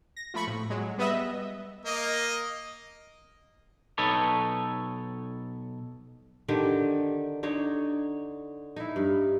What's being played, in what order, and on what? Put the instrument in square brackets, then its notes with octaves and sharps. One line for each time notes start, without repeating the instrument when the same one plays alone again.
[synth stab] A#6
F3 A3 B5 C#6
A2
F#3 G#3
G3 B3 B4 D#5 E5
[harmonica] A#3 D#5
[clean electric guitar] B1 D#4 A4 B4 C#5
[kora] D3 D#3 G4
D3 D#4 C#5
D#4 E4
G2